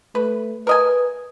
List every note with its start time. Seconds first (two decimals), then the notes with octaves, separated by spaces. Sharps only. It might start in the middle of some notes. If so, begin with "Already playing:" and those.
0.15 A3 B4
0.67 A#4 B4 D#5 G#5